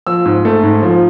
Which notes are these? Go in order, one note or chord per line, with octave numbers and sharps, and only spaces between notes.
F3 E6
G#2
A3
G#2
F3